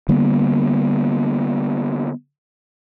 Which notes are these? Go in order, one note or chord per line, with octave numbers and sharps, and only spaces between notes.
D3 G3 A#3 B3